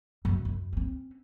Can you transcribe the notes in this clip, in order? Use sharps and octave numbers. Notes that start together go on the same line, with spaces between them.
F#2
F#2
C4 C#4